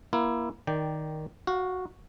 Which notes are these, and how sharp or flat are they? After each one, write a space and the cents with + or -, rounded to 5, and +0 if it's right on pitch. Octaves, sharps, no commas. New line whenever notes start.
A#3 +25 E4 +20
D#3 +0 D5 +0 G5 +0
F#4 -5 F5 +20